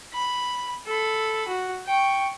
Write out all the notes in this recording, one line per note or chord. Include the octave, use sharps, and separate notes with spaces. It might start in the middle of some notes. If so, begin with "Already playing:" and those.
B5
A4 B5
F#4
G5 C#6